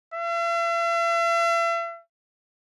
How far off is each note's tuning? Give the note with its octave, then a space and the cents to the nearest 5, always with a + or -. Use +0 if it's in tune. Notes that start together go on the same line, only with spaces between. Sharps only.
E5 +45